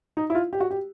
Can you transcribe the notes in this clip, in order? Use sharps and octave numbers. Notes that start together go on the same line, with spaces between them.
D#4
E4
F4
G4
F#4
G4